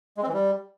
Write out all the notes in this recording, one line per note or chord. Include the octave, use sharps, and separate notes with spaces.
G#3
C4
E3
G3